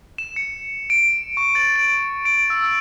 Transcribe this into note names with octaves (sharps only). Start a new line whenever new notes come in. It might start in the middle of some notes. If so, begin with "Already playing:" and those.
E7
C#7
D7
C#6
A6
D7
D7
E6